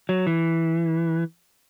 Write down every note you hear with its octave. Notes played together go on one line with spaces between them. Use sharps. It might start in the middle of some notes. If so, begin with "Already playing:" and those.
F#3
E3